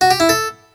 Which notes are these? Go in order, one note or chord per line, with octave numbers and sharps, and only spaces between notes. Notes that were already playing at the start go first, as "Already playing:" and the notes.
F#4
G4
E4
A4